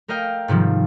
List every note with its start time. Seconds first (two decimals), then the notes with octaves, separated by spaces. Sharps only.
0.08 A3 A#4 D#5 F5 G5
0.48 G#2 C3 D#3 F3 G3